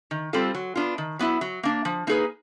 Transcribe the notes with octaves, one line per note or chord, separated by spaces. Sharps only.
D#3
G3 C4 F4 A4
F#3
B3 D4 F4
D#3
F#3 B3 E4
F#3
A#3 D4
F3
A#3 D#4 G#4 B4